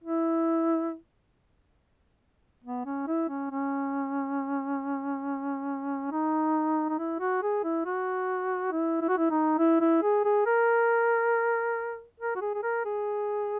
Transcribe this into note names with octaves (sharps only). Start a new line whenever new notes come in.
E4
B3
C#4
E4
C#4
C#4
D#4
D#4
E4
F#4
G#4
E4
F#4
E4
E4
F#4
E4
D#4
E4
E4
G#4
G#4
A#4
A#4
F#4
G#4
G#4
A#4
G#4